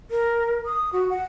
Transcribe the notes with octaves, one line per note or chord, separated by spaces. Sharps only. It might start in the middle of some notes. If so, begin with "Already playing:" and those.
A#4
D#6
F#4
F#5